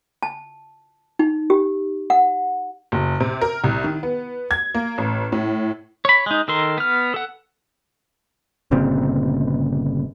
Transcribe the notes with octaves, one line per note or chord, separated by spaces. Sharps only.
A5
D#4
G4
F#5
F#1
C3
A#4
C2
D#3
B3
G#6
A#3
A1
A2
C#5 B5
G#3 D#4
D#3 A4 A#4 C6
B3 F6
A4 F#5
G1 A#2 C#3 C4